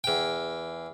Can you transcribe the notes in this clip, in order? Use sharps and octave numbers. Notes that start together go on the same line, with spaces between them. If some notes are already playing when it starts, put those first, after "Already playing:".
E2 G5